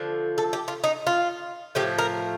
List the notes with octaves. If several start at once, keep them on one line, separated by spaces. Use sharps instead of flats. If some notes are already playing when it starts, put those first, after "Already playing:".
Already playing: D3 F3 A3
A4
G4
F4
D#4
F4
A2 F3 A3 G4
A#4